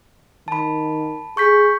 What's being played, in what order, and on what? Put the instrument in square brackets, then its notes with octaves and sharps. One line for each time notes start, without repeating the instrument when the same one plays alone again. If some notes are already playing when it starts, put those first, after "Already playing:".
[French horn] D#3 [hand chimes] A5 B5
[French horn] G#4 [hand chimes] C#6 G6 B6